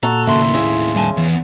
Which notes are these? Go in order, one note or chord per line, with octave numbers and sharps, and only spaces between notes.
A#2 F#4 A4 A#5
D#2 A2 C#3 A#3 E5 C6
C#3 E4
G3 G#5 A5
E2 E3